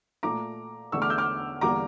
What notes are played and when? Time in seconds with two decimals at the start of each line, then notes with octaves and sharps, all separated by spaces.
0.23 A#2 A3 A#5 D6
0.92 E2 D3 A3 C#6 E6
1.02 D6 F6
1.10 E6 G6
1.18 D6 F6
1.61 E2 D3 G3 A#3 A#5 D6